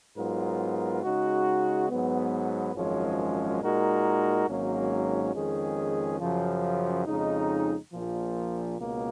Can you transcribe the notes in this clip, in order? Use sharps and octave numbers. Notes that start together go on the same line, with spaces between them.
G#2 F#3 B3 F4 A#4
C#3 G#3 D#4 F#4
G#2 F#3 B3
G#1 F#2 F3 G#3 C#4
A#2 G#3 D#4 F#4 A#4
G#1 G#2 F#3 A#3 C#4
F2 D#3 G#3 C#4 G#4
F#2 C#3 F3
F2 C#3 G#3 D#4
A#1 A#2 F3
C#2 B2 A#3